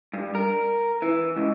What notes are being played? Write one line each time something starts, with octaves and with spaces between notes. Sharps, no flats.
G2
A#4
E3
C#2